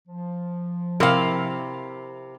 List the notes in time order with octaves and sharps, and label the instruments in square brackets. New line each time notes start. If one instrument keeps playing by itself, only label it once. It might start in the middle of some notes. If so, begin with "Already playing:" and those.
[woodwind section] F3
[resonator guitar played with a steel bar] C3 F5 [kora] C4 E4 A#4